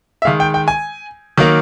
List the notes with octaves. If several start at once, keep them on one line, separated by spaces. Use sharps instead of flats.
E5
D#3 G#3 F5
G5
G5
G#5
D#3 F#3 A#3